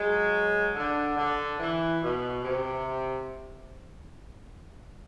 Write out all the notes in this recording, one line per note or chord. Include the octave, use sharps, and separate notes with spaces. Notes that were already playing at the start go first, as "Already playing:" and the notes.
Already playing: F#3 G#3
D3
D3
E3
B2
C3